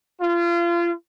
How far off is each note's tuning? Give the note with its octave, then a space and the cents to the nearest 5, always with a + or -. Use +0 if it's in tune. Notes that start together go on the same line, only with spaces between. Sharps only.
F4 -30